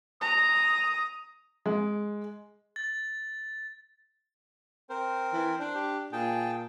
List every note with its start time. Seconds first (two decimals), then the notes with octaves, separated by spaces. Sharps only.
0.22 A#5 D#6
1.66 G#3
2.76 A6
4.90 C4 A#4 C5
5.33 E3
5.59 D4 C5
5.74 G4
6.13 A#2 G#4 G5 A5